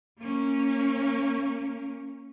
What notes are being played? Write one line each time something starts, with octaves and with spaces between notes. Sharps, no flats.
A#3 C#4